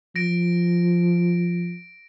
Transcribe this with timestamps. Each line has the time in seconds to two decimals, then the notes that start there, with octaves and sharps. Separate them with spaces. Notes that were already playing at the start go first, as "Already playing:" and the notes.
0.15 F3 A#6 D7